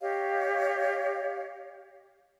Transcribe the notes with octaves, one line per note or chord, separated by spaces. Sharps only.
G4 C#5 D#5 F5